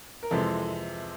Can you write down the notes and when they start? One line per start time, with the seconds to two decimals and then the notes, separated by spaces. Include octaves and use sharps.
0.23 A#4
0.31 F2 C3 E3 G#3 A4